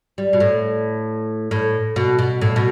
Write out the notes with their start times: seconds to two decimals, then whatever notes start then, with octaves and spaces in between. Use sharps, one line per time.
0.18 G3
0.33 B2
0.40 A2
1.51 A2
1.96 B2
2.19 B2
2.41 A2
2.56 B2